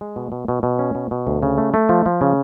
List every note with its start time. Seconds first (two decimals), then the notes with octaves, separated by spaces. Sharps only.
0.01 G#3
0.16 B2
0.32 B2
0.48 B2
0.63 B2
0.79 C#4
0.95 B2
1.11 B2
1.27 D2
1.43 C#3
1.58 A3
1.74 A3
1.89 F3
2.06 F3
2.21 C#3